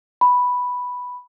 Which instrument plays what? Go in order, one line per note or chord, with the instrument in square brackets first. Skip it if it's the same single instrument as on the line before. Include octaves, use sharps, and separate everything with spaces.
[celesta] B5